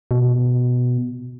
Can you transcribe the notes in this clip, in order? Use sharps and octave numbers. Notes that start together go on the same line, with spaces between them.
B2